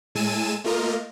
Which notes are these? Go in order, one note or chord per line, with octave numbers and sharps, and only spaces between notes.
A2 G#3 G#5 A5 E6 D#7
A3 A#3 F4 A#4 D#5